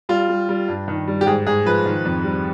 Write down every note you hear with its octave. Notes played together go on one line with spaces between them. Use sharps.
G3 F4
G3
G3
G2
D#3
G3
G4
G#2 G#4
G#2 G#4
F3 B4
D#3
F2
G3